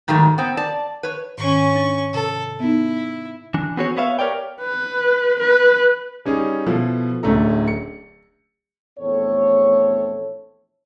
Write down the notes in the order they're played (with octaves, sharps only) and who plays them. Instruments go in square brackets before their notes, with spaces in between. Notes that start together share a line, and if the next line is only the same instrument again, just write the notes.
[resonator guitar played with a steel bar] G#2 D#3 F#3 G3 A3
B3 C4
D5 A5
B4 C#5
[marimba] G#2 D#3 [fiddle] C#4 C#6
[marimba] D4 A6
[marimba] C3 [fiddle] A4
[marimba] B3 D#4 [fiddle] E4
[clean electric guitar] E3 D4
B3 C4 F#4 G#4 C#5
B3 B4 C#5 E5 F5
G4 A#4 C#5 D5 G5
[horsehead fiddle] B4
B4
[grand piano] G3 C#4 D#4 G#4
B2 F3 E4 A4
D1 D3 A3 C#4 A4 A#5
C#7
[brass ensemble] A#1 E2 A3 C4 A4 C#5